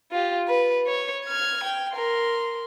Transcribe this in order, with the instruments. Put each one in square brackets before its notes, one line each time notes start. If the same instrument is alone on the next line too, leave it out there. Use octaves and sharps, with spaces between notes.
[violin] F4 G4
B4
C#5
F6 G#6
G5
A#4 C6